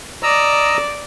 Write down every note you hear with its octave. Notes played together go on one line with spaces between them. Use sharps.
D5 D#5 A#5 E6